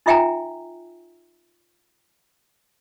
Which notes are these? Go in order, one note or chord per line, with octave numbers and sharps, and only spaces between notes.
D#4 F4 E5 G5 G#5 A#5